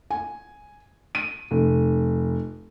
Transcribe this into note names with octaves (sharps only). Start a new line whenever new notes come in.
G#5
D#7
F1